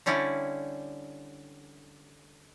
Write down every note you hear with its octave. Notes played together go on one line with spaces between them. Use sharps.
D3 G3 C#4 E4 D5